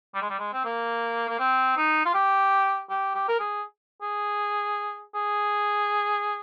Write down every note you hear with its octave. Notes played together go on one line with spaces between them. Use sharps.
G3
G#3
G3
G#3
C4
A#3
A#3
C4
D#4
F4
G4
G4
G4
A#4
G#4
G#4
G#4